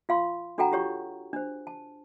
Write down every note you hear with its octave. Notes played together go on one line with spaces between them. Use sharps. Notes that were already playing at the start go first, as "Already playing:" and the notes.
F4 F5 C6
D4 F#4 A4 F#5 G5 A#5
F4 G4 C#5 C#6
D4 C5
A5